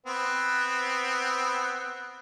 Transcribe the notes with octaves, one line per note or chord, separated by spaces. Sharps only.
B3 C4